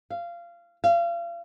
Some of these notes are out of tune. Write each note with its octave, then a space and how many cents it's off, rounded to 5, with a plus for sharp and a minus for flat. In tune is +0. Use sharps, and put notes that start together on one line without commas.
F5 -20
F5 -35